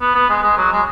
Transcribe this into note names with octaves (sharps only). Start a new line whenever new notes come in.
B3
B3
G#3
G#3
F#3
G#3